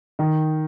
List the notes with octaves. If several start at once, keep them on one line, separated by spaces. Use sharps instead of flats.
D#3